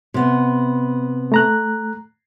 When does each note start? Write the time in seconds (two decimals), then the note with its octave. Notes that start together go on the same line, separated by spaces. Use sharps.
0.14 C3 B3
1.32 A3 A#5 F#6